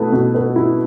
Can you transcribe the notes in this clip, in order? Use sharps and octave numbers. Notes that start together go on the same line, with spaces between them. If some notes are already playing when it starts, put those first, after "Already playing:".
Already playing: B2 A3 E4 B4
B2
B4
E4